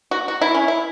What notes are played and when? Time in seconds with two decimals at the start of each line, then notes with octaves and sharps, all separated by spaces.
0.11 F#4
0.28 F#4
0.41 E4
0.54 C#4
0.68 E4